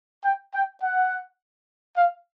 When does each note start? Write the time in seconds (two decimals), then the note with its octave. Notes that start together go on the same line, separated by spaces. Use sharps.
0.24 G5
0.54 G5
0.83 F#5
1.97 F5